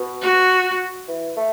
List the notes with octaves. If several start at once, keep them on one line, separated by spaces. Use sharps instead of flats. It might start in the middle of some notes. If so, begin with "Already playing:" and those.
Already playing: B2
F#4
E3
A3